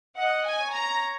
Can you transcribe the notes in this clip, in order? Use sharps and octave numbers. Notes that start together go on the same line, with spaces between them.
D#5 F#5
G#5
C#5
A#5